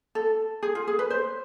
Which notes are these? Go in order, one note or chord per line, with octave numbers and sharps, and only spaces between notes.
A4
G#4
F4
G#4
B4
C5